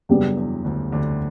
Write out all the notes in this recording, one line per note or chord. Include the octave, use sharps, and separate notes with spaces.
F#2 C#3 F#3 G3 B3 D4 G4
E2 E3
D2 D3
D2 D3